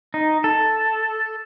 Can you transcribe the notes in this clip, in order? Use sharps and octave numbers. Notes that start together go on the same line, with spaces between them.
D#4
A4